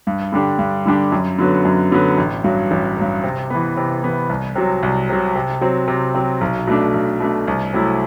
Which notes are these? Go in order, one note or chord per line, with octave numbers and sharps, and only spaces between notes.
G2
D3 G3 D4 G4
G2
D3 G3 D4 G4
F#2
D3 F#3 B3
F#2
D3 F#3 B3
A1
G2 F#3
A1
G2 F#3
C3
E3 B3
C3
E3 B3
C2
C3 F#3
C2
C3 F#3
C3
F#3 C4
C3
F#3 C4
B1
B2 A3 D4
B1
B2 A3 D4
C2
C3 F#3 A3 E4